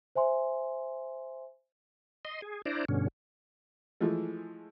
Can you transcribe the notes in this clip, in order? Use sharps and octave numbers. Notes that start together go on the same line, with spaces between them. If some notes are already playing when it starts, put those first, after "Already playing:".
C5 E5 G#5 C6
D#5 C6
G#4
D4 E4 C5 D5 A#5
G2 B2 D3 C#4
E3 F3 G#3 A3